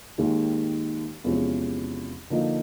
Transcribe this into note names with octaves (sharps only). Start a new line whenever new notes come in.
D#2 D#3 G#3
E2 C3 F3 G#3 C#4
D3 F3 A#3 D#4